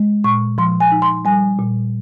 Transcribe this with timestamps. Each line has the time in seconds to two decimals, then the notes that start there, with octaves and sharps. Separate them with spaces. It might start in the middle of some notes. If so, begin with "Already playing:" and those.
Already playing: G#3
0.24 A#2 C#6
0.58 F3 C6
0.80 G#5
0.92 D#4
1.02 C6
1.25 G3 G#5
1.59 A#2